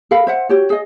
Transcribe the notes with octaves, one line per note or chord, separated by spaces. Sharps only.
A4 A#4 F5 B5
C5 E5 F#5
F#4 G4 C#5
G#4 D#5